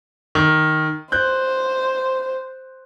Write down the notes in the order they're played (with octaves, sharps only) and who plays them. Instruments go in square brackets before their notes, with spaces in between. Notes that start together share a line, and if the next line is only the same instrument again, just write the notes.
[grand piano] D#3
[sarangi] C5 [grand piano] F#6 G6